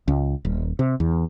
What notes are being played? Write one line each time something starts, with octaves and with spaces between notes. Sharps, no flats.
C#2
D#1
C3
E2